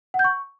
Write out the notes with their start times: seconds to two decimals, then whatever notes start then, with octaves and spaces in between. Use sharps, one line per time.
0.14 F#5
0.19 G6
0.24 C#6